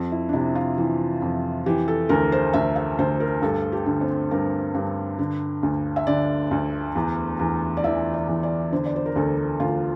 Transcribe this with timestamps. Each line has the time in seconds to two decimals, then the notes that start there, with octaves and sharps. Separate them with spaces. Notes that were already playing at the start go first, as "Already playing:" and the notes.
Already playing: F2
0.12 E4
0.29 D4
0.33 C3 E4
0.55 F4
0.78 E3
1.22 F2
1.66 E3 G4
1.88 A4
2.09 D2 A#4
2.32 C5
2.53 D2 E5
2.76 E5
2.99 D2 C5
3.20 A#4
3.42 G2 A4
3.72 G4
3.86 D3
4.01 C4
4.31 G2 A#4
4.74 G2
5.19 D3
5.63 D2
5.96 E5
6.07 D3 D5
6.51 D2
6.95 E2
7.39 E2
7.77 D5
7.84 E3 E5
8.14 D5
8.28 E2
8.43 D5
8.72 D3 C5
8.85 D5
8.96 C5
9.06 A#4
9.16 D2 A4
9.60 D2 F4